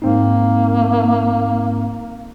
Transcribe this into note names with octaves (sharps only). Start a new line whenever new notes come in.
G#2 A#3 C4 D#4